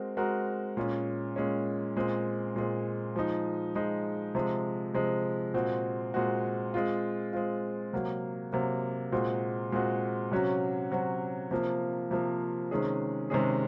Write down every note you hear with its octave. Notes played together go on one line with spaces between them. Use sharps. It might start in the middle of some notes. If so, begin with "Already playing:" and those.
Already playing: G#3 C4 F#4 A#4
G#3 C4 F#4 A#4
A#2 G#3 C#4
A#2 G#3 C#4
A#2 G#3 C4
A#2 G#3 C4
F3 G#3 D#4
F3 G#3 D#4
C3 F3 G#3
C3 F3 G#3
A#2 G#3 C4 F#4
A#2 G#3 C4 F#4
G#3 C4 F4
G#3 C4 F4
C3 F#3 A#3
C3 F#3 A#3
A#2 G#3 C4 F#4
A#2 G#3 C4 F#4
C3 F#3 C#4 F#4
C3 F#3 C#4 F#4
C3 F3 A#3
C3 F3 A#3
C3 D#3 G#3 C#4 G#4
C3 D#3 G#3 C#4 G#4